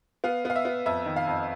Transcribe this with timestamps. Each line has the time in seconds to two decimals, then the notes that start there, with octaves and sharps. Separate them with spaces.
0.24 B3 F5
0.45 B3 F5
0.56 E5
0.65 B3
0.86 F2 E5
1.06 D#3
1.16 F5
1.27 F2